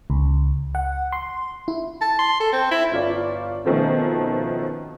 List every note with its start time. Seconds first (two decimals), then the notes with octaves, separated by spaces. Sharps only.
0.10 C#2
0.75 F#5
1.12 C6
1.68 E4
2.01 A5
2.19 C6
2.40 A4
2.53 C4
2.71 E4
2.91 G1 F4 D5
3.65 B2 D#3 F3 A3 C4 C#4